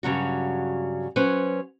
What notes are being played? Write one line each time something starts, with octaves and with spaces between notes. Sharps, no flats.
G2 C#3 F#3 F#4
F#3 C#4 B4 C5